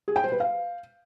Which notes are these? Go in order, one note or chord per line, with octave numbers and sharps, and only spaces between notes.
G#4
G5
C5
B4
F5